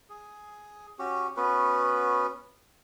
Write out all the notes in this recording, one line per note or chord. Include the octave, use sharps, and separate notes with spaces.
G#4
C#4 F#4 G4
B3 C#4 F#4 B4